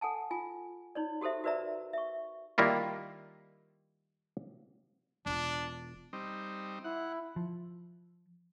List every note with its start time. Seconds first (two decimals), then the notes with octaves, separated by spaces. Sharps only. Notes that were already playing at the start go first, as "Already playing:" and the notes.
0.01 A4 F#5 G#5 A5
0.31 F4 G#5
0.95 D#4 C#5 D5
1.21 F#4 G4 A4 C5 E5
1.44 F#4 A#4 B4 D5 E5 A#5
1.93 E5 C#6
2.58 D#3 G3 A#3 E4 F4
5.26 E1 D4 F4
6.13 G3 C4 D#4
6.84 E4 F#5
7.36 F3